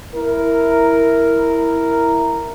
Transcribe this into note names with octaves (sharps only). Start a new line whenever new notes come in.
E4 A#4